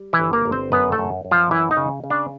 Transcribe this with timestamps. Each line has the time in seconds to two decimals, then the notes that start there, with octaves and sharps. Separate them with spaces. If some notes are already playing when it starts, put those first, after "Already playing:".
Already playing: G3
0.13 E3 E4
0.19 G1
0.33 A#3 A#4
0.45 G1
0.52 C4 C5
0.72 F#2 B3 B4
0.92 A3 A4
0.98 F#2
1.25 F#2
1.31 F3 F4
1.51 F#2 E3 E4
1.71 D#4
1.77 C#3
2.04 C#3
2.10 D4